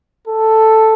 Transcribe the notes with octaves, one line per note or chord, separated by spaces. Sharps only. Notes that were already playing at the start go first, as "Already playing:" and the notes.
A4